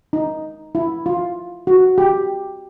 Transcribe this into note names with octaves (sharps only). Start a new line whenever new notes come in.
D#4
E4
F4
F#4
G4